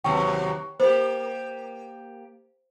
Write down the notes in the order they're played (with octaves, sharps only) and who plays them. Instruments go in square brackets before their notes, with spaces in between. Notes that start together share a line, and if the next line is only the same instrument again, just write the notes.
[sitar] D#2 C3 F#3 [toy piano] G5 C#6
[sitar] A#3 G4 [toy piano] C5